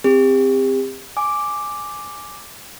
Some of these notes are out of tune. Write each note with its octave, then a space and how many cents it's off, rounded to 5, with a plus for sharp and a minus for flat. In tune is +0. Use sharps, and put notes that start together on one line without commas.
C4 +0 G4 +35
G#5 +5 D6 +0